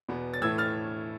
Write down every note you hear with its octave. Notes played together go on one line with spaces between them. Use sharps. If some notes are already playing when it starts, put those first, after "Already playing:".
E2 B2 B3
A6
A2 E3 A3 E6 G#6
F6 A6